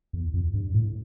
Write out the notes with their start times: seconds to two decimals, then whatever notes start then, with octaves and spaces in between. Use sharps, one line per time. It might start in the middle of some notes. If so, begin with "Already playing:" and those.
0.13 E2
0.34 F2
0.54 G2
0.74 A2